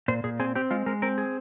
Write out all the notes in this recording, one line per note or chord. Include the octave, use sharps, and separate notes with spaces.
A#2 C5
A#2 G#4
C4 G#4
C4 G4
G#3 F4
G#3 A#4
C4 A#4
G#4